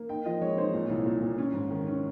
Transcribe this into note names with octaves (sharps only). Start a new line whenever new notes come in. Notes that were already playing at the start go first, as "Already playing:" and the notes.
Already playing: A#3
D#4 G5
F3 D#5
G#3 C#5
D#4 C5
A#2 C#5
C2
A#2
A#2
C#4
G#2
D#3
C#4